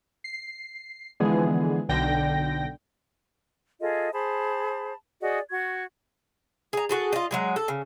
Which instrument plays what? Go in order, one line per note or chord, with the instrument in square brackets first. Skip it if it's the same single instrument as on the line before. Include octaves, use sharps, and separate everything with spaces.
[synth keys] C7
D3 E3 F3 G#3 B3 G#4
B1 D3 G5 A#6
[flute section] F4 G#4 A4 D#5
G#4 C5 A5 B5
F#4 G#4 D5 D#5
F#4 C#6 G#6
[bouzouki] G#4 A#5
F#4 G#4 A4
F4 D#5
F#3 G#3 G#4
A4
C#3